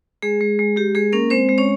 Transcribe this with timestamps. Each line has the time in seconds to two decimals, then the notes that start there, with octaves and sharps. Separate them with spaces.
0.22 G#3 G#4
0.41 G#3
0.59 G#3
0.77 G#3 G4
0.95 G#3 G#4
1.12 A#3 C#4 A#4
1.30 G#3 C4 C5
1.49 G#3
1.58 C#4 C#5